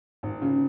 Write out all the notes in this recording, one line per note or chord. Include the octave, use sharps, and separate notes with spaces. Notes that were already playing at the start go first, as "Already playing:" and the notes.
G#1
C#3